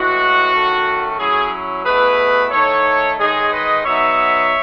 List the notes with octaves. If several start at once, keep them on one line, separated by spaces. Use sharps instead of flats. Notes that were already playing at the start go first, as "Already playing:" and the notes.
Already playing: A2 E3 G#3 F#4
D#3 A3 C#4
F#3 C#4 E4 G#4
B2 A3 E4 G#4 B4
D#3 A3 D#4 A4 C#5
D#3 G#3 D#4 G#4
B4 D#5
F#3 B3 D#4 C#5 E5